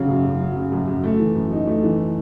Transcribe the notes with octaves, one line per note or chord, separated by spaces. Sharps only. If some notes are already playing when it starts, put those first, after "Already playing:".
Already playing: C#3 F#3
F#2
F#2
F#3
C#3
F#2
F#2
A3
E3
F#2
D#4
A3
E3